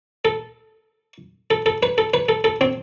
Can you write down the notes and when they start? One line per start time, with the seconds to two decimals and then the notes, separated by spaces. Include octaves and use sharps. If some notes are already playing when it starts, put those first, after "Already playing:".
0.25 A4
1.51 A4
1.66 A4
1.83 B4
1.98 A4
2.14 B4
2.29 A4
2.44 A4
2.61 C4